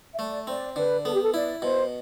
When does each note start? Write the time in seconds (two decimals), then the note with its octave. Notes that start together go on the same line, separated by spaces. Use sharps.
0.13 E5
0.19 A3 D5
0.47 C4 D5
0.76 D3 B4
1.05 B3 A4
1.13 G4
1.22 A4
1.33 E4 D5
1.62 B2 C5